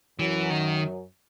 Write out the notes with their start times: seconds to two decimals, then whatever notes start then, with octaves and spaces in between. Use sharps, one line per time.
0.19 F#2 E3 F#3
0.50 D#3